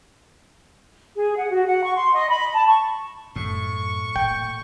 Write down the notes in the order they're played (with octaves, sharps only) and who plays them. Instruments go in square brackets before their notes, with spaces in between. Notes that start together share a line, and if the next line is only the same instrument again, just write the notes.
[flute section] G#4
F#5
F#4
F#5
C#6
C6
D#5
B5
A5
C#6
[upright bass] F#2 [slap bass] A2 [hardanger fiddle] C#6
[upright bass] A#2 [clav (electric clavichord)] G5